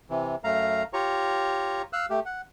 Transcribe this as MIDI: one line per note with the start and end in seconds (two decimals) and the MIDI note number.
0.10 0.35 48
0.10 0.35 52
0.44 0.83 42
0.44 0.83 57
0.44 0.83 77
0.44 0.83 82
0.93 1.82 65
0.93 1.82 67
0.93 1.82 73
0.93 1.82 82
0.93 1.82 85
1.93 2.06 77
1.93 2.06 88
1.93 2.06 90
2.10 2.20 57
2.10 2.20 67
2.26 2.41 78